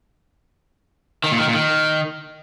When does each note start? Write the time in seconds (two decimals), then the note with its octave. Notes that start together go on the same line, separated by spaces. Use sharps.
1.24 D#3
1.31 A#2
1.39 D#3
1.47 A#2
1.55 D#3